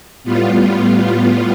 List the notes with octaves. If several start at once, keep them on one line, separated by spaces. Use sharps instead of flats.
A2 G3 B3 F4